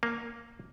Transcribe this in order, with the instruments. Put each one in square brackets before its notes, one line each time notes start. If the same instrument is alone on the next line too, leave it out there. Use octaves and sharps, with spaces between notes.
[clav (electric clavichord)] A#3